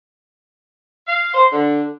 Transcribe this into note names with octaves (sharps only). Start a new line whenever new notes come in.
F5
C5
D3